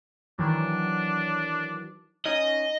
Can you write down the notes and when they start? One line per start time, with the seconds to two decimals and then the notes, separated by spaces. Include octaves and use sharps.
0.39 D#3 E3 F#3 D4
2.25 C#4 D#4 D#5